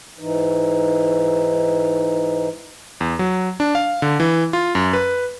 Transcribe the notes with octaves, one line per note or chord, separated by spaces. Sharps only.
G#2 E3 D#4
E2
F#3
D4
F5
D3
E3
F4
F#2
B4